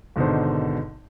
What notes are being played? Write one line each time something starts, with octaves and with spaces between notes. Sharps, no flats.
G#1 B2 D3 D#4 C5